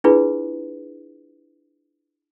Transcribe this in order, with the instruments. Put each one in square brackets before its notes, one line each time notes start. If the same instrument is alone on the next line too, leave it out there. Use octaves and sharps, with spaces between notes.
[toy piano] D4 E4 F4 G#4 B4